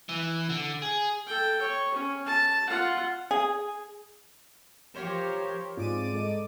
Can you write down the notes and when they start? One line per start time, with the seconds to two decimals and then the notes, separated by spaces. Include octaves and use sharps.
0.09 E3
0.49 D3
0.82 G#4
1.27 A4 G5
1.61 C#5
1.94 C#4
2.26 A5
2.67 F4 F#5
3.31 G#4
4.95 F3 G4 A#4 C5 C#5
5.77 G#2 C4 F4 D5 D6 D#7
6.13 G#3 A4 D#5